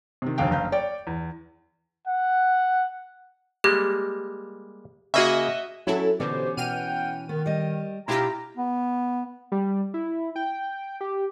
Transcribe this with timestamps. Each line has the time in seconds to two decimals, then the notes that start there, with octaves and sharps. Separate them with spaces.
0.22 C3 D#3
0.38 F1 D#2 D3 F5 G5
0.51 F#1 F5 G6
0.72 C#5 D5 G5
1.07 E2
2.07 F#5
3.64 G3 G#3 A#3 G4
5.14 C#3 A#3 F#4 G#4 D#5 E5
5.87 F#3 C#4 E4 A4
6.20 B2 D3 E3 B3 C#4 G4 C5
6.57 B2 F#5 G5 F6 D#7
7.29 D#3 B3
7.46 G3 D#5
8.08 B2 D4 E4 F4 G4 G5 A#5
8.57 B3
9.52 G3
9.94 E4
10.36 G5
11.01 G4